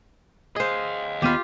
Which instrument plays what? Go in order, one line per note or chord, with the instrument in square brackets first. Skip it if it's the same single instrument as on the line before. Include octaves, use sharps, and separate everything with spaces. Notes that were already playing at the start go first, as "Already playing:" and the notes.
[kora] G#4 C5 [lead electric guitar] D#5 F5
[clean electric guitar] D#2 B3 B5 [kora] F4 G4